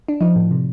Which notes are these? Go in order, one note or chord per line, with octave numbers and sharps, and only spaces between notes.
D4
F3 D#4
A2
C3